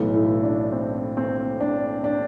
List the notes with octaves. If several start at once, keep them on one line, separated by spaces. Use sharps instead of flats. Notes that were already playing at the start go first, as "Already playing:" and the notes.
Already playing: B1 A2 E3
E4
D4
C4
C4
D4
D4